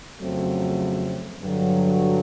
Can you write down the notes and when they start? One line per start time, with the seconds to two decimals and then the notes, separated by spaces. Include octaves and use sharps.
0.20 F2 C#3 F#3 A3 C4
1.41 G2 D3 F#3